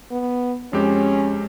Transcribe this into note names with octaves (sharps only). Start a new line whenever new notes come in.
B3
F2 G#3 C#4 G4